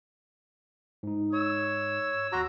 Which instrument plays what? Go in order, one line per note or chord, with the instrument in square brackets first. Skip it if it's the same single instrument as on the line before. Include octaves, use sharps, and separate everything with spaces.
[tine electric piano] G#2 D#4
[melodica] C#5 [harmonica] E6
[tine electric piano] D#2 C6 D6 [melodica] F#4 A#5